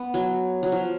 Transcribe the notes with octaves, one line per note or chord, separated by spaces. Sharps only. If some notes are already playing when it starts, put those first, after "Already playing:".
Already playing: B3
F#3
F#3
F3